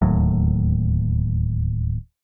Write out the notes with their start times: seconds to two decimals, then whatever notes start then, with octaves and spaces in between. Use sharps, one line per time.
0.02 D1 D#2 A2 F#3